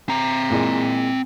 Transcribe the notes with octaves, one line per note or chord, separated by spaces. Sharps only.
C4 A#5
A#2 E3 G#3